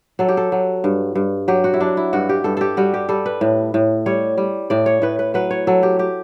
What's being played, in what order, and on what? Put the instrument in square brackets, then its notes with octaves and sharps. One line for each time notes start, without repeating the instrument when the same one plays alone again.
[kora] F#3 A4
G4
A4
F#3
G2
G2
F#3 G4
F#4
E4
F#3 D4
E4
G2 F#4
G4
G2 A4
G4 A4
G3 F#4
G4
G3 A4
B4
A2
A2
G3 C#5
G3
A2 D5
C#5
A2 B4
B4
F#3 B4
C#5
F#3 A4
G4
G4